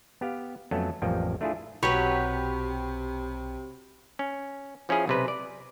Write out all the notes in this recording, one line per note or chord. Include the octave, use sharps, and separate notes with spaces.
B3 G4 F5
F2 F#3 A3 B3 C#4 A4
A1 F2 F3 G3 A#3 G5
A3 D4 E4 F4 G#4
B1 C3 F#3 G4 B4 C#5 B5
C#4
F3 C#4 E4 G#4
B1 C3 B4
D5